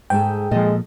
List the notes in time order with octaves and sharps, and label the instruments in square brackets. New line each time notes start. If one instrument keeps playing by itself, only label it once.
[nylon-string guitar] G#2 G#3 A4 [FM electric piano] G5
[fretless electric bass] A#2 F3 [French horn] G#3 [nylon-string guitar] A4 D#5